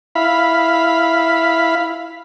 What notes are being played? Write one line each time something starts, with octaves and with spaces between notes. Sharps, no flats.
E4 F5 B5